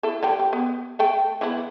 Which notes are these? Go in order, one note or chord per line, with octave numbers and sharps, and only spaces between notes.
E4 A4
D3 G3 G5
G4
B3
A3 A4 G5
E3 B3 E4